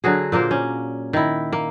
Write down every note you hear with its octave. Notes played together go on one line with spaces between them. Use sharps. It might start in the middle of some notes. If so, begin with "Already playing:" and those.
D3 F#3 F#4 G#4
A#2 A#3 A#4 C5
C#4
D#3 E4
A#3